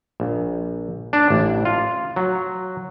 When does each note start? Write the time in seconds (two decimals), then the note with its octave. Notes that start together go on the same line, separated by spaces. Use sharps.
0.20 A#1
1.13 D4
1.30 A1
1.65 F4
2.16 F#3